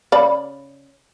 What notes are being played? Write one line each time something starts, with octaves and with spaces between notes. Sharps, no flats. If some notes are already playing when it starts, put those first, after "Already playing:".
C#3 D5 B5